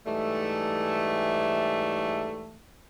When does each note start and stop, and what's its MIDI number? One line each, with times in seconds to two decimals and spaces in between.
0.06 2.61 44
0.06 2.61 52
0.06 2.61 55
0.06 2.61 57